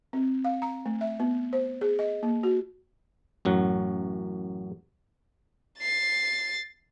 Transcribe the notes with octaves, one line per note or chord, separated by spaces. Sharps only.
C4
F5
A#5
A3
E5
B3
C5
G#4
D#5
A#3
F#4
A1 F#2 F#3 F#5
A6 C7